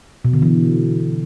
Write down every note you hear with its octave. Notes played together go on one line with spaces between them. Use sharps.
B2
D3
E3